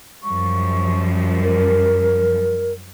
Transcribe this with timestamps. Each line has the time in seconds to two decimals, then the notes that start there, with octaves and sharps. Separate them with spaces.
0.23 F#2 F3 G3 C#6
1.42 A#4